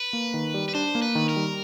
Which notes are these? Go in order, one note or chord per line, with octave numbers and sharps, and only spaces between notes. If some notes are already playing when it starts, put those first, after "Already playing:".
Already playing: B4
A#3
D#3
G3
B4
D4 C5
A#3
B4
D#3
A#4
G3